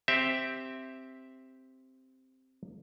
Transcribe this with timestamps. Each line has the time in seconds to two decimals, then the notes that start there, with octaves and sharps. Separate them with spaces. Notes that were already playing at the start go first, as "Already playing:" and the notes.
0.08 C4 G4 E5